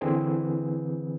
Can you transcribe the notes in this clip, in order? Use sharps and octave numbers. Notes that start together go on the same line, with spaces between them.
D3 E3 C4 E4 G#4 B4